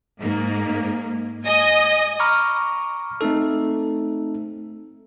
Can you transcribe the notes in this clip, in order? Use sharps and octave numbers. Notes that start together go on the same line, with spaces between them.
G#2 A#3
D#5 G#5 D#6
A#5 B5 C#6 D6 F6
A3 C4 D#4 A4